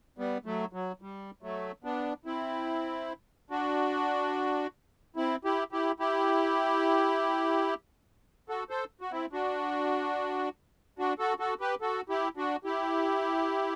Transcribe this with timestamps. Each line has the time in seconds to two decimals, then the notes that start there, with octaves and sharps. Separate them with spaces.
0.18 G3 B3
0.45 F#3 A3
0.73 F#3
1.02 G3
1.42 F#3 A3
1.84 B3 D4
2.25 C4 E4
3.50 D4 F#4
5.16 C4 E4
5.44 E4 G4
5.72 E4 G4
6.00 E4 G4
8.49 F#4 A4
8.70 A4 C5
9.01 F#4
9.11 C4 E4
9.32 D4 F#4
10.99 D4 F#4
11.19 F#4 A4
11.40 F#4 A4
11.60 G4 B4
11.81 F#4 A4
12.09 E4 G4
12.37 D4 F#4
12.64 E4 G4